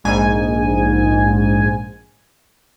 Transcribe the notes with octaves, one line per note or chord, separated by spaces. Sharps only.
A#1 G#2 G#5